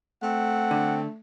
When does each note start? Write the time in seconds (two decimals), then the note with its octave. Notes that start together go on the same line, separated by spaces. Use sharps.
0.23 A3 C4 F#5
0.71 D3